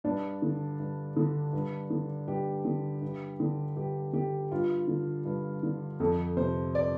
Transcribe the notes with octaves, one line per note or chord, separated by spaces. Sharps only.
G2 D4
D3
G2
D3
G2
D3
G2 G4
D3
G2
D3
G2 G4
D3 G4
G2 F4
D3
G2
D3
F2 A4
C3 C5
D5